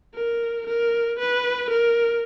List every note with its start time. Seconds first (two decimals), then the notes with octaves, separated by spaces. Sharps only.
0.14 A#4
0.67 A#4
1.19 B4
1.70 A#4